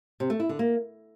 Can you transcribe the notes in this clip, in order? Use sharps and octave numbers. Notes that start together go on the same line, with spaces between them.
C3
A3
E4
D3
A#3